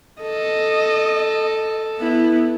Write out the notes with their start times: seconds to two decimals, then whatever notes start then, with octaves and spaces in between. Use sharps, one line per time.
0.22 A4 D#5
1.98 B3 E4